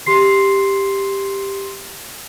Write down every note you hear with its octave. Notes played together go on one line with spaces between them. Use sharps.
G4 C6 C7